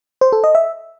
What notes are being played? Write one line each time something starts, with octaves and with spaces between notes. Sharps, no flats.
C5
A4
D#5
E5